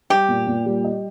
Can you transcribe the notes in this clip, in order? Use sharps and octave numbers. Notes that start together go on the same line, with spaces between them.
G3 G4
A#2
A#2
G3
D#5